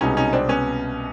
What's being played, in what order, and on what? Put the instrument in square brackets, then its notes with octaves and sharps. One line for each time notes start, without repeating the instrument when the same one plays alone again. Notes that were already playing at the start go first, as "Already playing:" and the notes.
[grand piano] C2 B2 G#3 [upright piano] C#4 D#4
[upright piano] C#4 D#4
C4 D4
B3 C#4